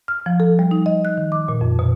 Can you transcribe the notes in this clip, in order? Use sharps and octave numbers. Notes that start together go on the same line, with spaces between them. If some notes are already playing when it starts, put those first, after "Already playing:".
F6
F3
A4
G3
D#4
D#5
F#6
D#3
D6
A#2
F2
B2